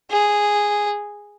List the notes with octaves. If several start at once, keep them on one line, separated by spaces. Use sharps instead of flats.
G#4